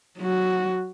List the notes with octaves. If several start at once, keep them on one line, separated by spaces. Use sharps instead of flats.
F#3 F#4